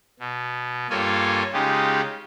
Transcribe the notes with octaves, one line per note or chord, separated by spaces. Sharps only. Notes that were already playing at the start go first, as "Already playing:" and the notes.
B2
G2 A#3 F4 A4 C#5 G#5
C#3 G#3 D#4 F4 G4